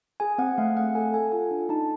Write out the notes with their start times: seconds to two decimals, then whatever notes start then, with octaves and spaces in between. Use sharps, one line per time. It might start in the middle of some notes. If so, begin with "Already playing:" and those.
0.20 G#4 G#5
0.38 C4 F#5
0.58 A3 F5
0.76 A3 F#5
0.95 A4 G#5
1.14 A4 G#5
1.32 F4 G#5
1.51 D4
1.69 D#4 A5